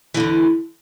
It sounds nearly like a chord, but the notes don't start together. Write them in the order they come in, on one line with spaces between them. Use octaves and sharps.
E3 D3 E2